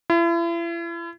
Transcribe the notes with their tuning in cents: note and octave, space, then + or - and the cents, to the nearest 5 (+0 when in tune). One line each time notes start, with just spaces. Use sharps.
E4 +40